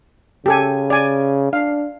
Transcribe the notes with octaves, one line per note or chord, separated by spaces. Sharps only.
C#3 G4 A4 G#5
D5 G#5
D4 F5